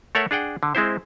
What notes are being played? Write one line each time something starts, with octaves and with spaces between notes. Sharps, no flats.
A3 A4 A#4 C#5 E5 F#5
D4 G#4 F#5 G5
D3
G#3 C4 E4 C5